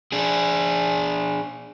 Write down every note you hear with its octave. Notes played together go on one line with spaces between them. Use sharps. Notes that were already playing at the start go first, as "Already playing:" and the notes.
D4 G#4